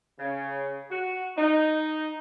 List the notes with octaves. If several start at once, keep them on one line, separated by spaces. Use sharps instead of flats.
C#3
F#4
D#4